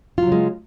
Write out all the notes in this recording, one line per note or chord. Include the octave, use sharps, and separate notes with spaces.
C#3 F#3 G#3 F4